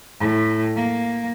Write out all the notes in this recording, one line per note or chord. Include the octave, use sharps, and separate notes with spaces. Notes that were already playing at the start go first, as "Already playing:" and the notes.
A2
A#3